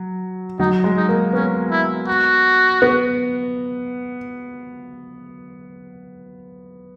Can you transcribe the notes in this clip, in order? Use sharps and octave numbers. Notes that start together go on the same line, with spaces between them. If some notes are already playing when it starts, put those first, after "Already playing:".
Already playing: F#3
F#3 D#4
G#3
D#4
A#3
B3 C#4
E4
F#4
B3